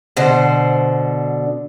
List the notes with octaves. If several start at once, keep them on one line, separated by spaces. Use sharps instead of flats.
B2 D3 C5